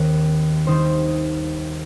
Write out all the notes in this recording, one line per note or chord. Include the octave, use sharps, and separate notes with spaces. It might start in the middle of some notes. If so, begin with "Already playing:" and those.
Already playing: D#2 D#3 C4 A#4
D#3 G3 D#4 C5